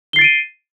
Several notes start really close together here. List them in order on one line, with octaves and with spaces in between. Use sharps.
G7 C7 A6 D7 D#7